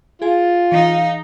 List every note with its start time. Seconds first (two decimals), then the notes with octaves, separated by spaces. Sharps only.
0.22 F4 G#4 G#5
0.72 E3 D#4 F5